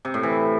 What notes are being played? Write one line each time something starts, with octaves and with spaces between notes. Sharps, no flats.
C3
A2
E3